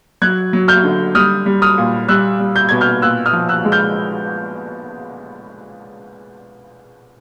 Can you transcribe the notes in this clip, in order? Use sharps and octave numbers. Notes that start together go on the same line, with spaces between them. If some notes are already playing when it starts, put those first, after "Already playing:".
F#3 F#6 G#6
F#3
F6 G6
D3
G3 D#6 F6
G3
D#6 F6
A#2
G3 E6 F#6
G3
G6
B2 G#6
F6 G6
A#2 E6 F#6
D#6 F6
F3
E6 F#6
G#3
F6 G6